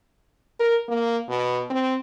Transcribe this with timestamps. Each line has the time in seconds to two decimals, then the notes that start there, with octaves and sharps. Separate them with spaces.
0.60 A#4
0.88 A#3
1.29 B2
1.70 C4